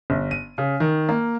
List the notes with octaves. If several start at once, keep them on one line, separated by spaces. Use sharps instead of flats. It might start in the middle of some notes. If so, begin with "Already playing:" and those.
G1
D#7
C#3
D#3
A#3